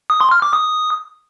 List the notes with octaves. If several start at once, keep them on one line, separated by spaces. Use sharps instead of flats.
D#6
C6
F6
D6
D#6